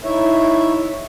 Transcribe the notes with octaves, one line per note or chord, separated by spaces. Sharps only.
D#4 E4 C#5 E5